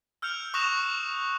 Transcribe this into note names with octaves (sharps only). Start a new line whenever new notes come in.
E6 F6 G6 C#7 F7
C#6 D#6 F#6 A#6 E7 F7